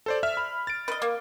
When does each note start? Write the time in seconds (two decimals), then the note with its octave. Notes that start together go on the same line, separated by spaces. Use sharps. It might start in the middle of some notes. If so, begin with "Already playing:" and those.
0.06 A4 C5 D5
0.23 E5 F6
0.37 B5
0.67 A6 D7
0.88 B4 D#5
1.02 A#3